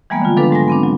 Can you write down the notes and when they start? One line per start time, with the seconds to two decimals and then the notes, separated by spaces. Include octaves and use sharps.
0.10 E3 G3 G#3 A#3 B3
0.22 D3 D#3 F4
0.37 F3 F#3 B3 D4 A4 B4
0.51 G#2 G#3 G#5 A#6
0.68 B3 C4 D4
0.83 F#3